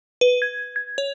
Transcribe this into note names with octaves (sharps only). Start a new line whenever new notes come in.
B4
G#6
G#6
C#5